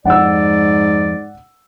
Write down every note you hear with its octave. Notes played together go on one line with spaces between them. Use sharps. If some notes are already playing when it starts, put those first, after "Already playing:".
F2 G#2 D5 F#5 E6